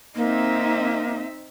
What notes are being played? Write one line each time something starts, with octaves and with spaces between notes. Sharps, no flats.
A#3 C4 D#4 E5